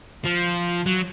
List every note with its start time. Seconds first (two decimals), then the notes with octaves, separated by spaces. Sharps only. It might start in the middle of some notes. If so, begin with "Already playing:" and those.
0.25 F3
0.86 F#3